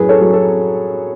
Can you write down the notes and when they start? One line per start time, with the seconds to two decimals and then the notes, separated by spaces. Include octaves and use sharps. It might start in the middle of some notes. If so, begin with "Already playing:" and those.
Already playing: F#2 A2 G#4 B4
0.09 A4 C#5
0.21 F#3
0.33 A4